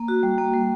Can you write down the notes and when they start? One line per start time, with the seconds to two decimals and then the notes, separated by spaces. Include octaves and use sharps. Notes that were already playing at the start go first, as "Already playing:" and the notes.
Already playing: A#3
0.08 F#4
0.23 G3
0.38 A#3
0.53 G3